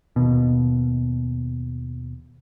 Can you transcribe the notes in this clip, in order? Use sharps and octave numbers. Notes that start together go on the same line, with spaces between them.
D#2 B2